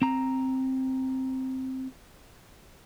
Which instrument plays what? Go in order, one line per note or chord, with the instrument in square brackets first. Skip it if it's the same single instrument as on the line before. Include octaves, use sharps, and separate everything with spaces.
[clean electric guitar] C4 A#5